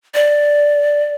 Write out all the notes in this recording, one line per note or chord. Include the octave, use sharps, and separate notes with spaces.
D5